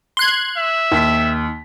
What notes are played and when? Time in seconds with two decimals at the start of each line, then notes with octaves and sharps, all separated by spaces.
0.17 C6 F#6 G#6
0.57 E5
0.92 D#2 B6